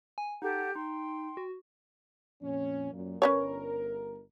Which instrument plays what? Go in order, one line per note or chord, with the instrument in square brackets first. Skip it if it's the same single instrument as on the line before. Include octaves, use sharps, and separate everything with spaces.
[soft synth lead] G#5
[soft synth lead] D#4 [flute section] G4 A4 F#5
[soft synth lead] D#4 [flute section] G5 C6
[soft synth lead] F#4
[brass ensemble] F2 A#2 C#4
F#2 A#2
[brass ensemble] G1 A#4 [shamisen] C#4 B4 C#5